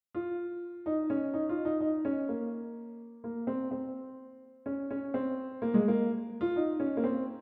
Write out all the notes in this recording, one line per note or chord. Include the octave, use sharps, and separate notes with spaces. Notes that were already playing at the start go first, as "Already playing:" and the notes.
F4
D#4
C#4
D#4
F4
D#4
D#4
C#4
A#3
A#3
C4
C4
C#4
C#4
C4
A#3
G#3
A#3
F4
D#4
C#4
A#3
C4